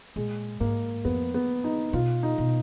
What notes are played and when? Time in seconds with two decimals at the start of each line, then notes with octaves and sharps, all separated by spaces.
0.16 A#2 G#3
0.60 G#2 A#3
1.05 F2 B3
1.34 B3
1.64 D#4
1.93 B2 F4
2.23 D#4
2.38 B2